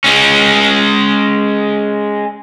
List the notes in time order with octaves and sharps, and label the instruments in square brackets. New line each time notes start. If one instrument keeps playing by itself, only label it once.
[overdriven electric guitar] G#3 C#4